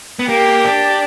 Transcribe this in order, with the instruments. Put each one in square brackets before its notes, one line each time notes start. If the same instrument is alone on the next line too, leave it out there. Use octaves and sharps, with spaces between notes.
[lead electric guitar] B3
[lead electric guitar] A#3 [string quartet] G4
[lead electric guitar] D4